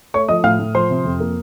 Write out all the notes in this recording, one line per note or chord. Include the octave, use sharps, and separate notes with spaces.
A3 C#5 C#6
F3 D#5 D#6
A2 F5 F6
A2
F3 C5 C6
C3
F2
A#3